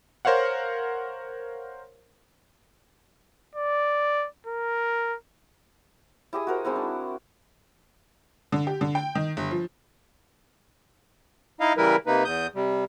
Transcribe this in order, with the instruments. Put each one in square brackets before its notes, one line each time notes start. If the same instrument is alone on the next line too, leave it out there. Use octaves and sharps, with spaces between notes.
[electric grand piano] A#4 C5 C#5 F5 F#5
[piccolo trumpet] D5
A#4
[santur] E4 G4 G#4 D#5
F#4 A#4 C5
G#3 C4 D#4 E4
D4
[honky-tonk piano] D3
G4
D3
G5
D#3
G1
F3
[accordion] D#4 E4 D#5 F5
C#3 E3 G3 E4 A#4 B4
C3 A#3 D#4 B4
E2 D#6 G6
C3 G3